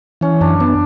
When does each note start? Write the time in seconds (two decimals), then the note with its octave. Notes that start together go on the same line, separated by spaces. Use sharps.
0.21 E3 C#4
0.41 F#2 D4
0.60 B3 D4